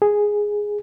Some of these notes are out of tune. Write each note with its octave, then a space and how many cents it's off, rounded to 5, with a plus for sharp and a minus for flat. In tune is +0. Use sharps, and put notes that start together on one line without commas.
G#4 +0